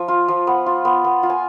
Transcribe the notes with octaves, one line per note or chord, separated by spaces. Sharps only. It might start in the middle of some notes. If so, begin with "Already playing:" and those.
Already playing: F3
F4
F3
B3
F4
B3
B3
F4
G#5